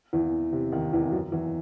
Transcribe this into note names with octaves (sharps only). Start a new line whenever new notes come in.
E2 E3
C3
D#2 D#3
E2 E3
F#2 F#3
E2 E3